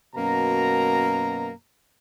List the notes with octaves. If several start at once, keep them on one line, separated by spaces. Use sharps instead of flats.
F#2 B2 A#3 A#5